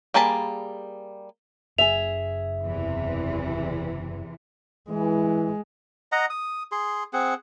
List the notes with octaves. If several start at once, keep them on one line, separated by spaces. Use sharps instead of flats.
G3 A#3 G#4 A5 B5
F#1 F#2 G#4 E5 F7
E2 C3 E3
E3 G#3
D#5 F#5 A#5
D#6
G#4 C6
C4 G#4 F#5